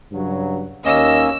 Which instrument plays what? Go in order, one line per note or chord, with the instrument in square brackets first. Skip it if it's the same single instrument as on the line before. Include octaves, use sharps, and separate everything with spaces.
[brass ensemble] G2 C#3 F#3
[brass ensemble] D#2 [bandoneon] A#3 C#4 [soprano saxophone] D#5 [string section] E6